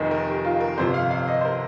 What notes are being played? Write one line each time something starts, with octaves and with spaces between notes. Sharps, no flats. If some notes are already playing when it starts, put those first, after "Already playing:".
Already playing: F1 D#2 D#3 D#5
A#4
G4
F4
A#4
G1 F2 C3 F3 C5
F5
F5
D#5
C5
A#4